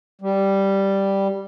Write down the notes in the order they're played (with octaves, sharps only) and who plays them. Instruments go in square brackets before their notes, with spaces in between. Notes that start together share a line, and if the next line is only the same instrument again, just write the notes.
[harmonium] G3